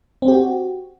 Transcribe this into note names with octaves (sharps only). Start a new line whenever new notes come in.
C4
G4
F#4